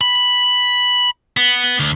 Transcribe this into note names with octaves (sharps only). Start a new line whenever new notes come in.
B5
B3
D2